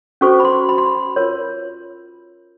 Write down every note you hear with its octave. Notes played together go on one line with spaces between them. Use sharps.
C#4 F#4 A4 C5 C#6
B5
C6
B5
C6
B5
F4 A#4 C#5